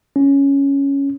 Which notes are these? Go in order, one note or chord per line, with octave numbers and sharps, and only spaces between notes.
C#4